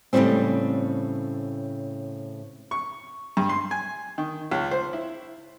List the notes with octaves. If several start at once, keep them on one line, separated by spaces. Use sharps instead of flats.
A2 C#3 E3 F#3 G3 C4
C#6
G2
C6
G#5
D#3
C#2
C5
E4